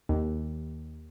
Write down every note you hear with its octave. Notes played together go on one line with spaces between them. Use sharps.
D#2